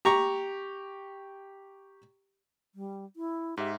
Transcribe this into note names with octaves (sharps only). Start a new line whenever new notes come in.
G4 A#5 C#6
G3
E4
G#2 G4 E5